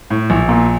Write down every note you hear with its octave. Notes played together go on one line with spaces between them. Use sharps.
A2
A#1
A#2